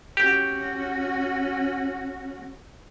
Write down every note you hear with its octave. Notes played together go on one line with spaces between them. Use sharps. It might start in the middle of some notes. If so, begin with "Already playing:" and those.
C#4 F#4 G4